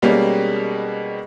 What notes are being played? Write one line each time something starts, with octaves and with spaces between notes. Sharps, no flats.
B2 G3 G#3 A#3 C#4